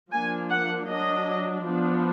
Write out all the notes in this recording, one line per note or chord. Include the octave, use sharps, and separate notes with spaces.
F3 A#3 D4 G#5
F#5
F#3 D4 D#5
F3 B3 D4